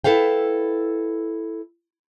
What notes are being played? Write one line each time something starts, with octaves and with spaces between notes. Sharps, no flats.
E4 A4 B4 F5 G5